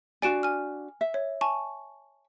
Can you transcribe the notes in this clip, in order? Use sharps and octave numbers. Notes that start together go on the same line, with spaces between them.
D4 F#4 D5 G#5 D7 E7
G#5 F6
E5
C#5
G#5 A5 C#6